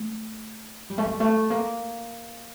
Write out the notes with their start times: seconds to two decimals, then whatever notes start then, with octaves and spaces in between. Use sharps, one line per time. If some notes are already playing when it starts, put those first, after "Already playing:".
Already playing: A3
0.90 G3
0.98 A3
1.05 G3
1.20 A3
1.50 A#3